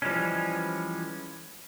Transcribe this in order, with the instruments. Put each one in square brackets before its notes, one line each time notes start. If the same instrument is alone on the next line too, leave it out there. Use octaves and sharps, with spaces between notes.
[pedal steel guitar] E3 F3 G3 G#3 C#4